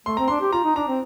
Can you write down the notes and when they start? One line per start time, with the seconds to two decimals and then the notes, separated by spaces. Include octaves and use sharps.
0.06 A3 C6
0.17 C4 A#5
0.28 D4 C6
0.41 G4
0.53 F4 A#5
0.64 D#4
0.76 D4 A#5
0.87 C4